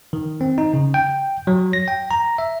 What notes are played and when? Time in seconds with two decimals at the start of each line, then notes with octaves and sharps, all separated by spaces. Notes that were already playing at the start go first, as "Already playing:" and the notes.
0.13 D#3
0.41 C4
0.58 D#4
0.74 C#3
0.94 G5
1.47 F#3
1.73 A#6
1.88 G5
2.11 A#5
2.38 E5